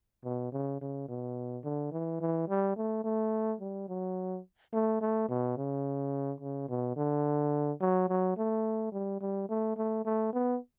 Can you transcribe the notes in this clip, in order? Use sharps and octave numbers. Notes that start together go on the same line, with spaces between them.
B2
C#3
C#3
B2
D3
E3
E3
G3
A3
A3
G3
F#3
A3
A3
B2
C#3
C#3
B2
D3
F#3
F#3
A3
G3
G3
A3
A3
A3
B3